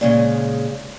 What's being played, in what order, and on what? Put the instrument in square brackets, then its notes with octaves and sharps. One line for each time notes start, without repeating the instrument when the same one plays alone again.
[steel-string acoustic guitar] A#2 C#3 G#3